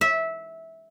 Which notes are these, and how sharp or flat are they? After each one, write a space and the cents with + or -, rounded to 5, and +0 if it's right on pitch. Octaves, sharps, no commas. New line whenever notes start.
E5 -15